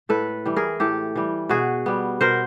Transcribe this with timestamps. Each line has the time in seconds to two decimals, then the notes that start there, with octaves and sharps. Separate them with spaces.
0.09 A2 A4 B4
0.46 E3 G3
0.56 G#4 A#4
0.80 A2 G4 A4
1.16 E3 G3
1.49 B2 F#4 G#4
1.86 G3 B3
2.21 B2 A#4 C5